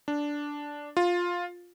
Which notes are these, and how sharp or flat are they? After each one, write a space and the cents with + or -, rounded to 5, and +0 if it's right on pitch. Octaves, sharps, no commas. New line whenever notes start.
D4 -5
F4 +10